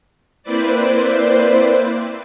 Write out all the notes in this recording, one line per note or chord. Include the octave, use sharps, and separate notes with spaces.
A#3 C4 E4 B4 C5 D5